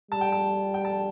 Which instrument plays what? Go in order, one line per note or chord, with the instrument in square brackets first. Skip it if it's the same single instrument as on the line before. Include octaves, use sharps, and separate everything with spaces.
[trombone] G3 [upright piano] A5
[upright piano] G5
A5
G5
A5